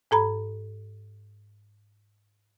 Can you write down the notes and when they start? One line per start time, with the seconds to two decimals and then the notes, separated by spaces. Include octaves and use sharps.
0.11 G#2 A4 A#5 B5